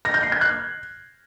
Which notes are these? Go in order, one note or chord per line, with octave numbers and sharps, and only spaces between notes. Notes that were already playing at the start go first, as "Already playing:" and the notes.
A#6
G6
C7
G#6
F#6